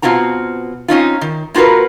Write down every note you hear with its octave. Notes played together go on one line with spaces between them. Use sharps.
B2 C4 F4 F#4 A#5
C4 C#4 D#4 F4
D#3
A#3 F4 F#4 A#4 B4